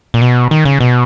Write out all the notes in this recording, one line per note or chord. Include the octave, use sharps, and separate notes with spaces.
A#2
B2
D#3
C#3
B2